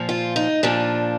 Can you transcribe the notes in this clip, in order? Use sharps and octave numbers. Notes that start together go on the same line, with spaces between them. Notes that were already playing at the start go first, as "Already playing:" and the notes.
Already playing: A#2 F3
F4
D#4
A#2 F3 D4